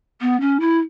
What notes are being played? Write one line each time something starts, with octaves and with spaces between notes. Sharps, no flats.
B3
C#4
E4